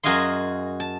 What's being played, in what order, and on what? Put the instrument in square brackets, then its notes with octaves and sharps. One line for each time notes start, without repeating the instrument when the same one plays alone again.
[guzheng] F#2 F#4 G#4 D#5 F5 C6
A5